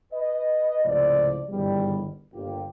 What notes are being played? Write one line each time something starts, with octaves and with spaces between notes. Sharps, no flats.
B4 D#5
C#2 A2 C3 F3 C5 D5
G1 E2 G#2 B2 D#3 G3
G1 A#3 F4 G4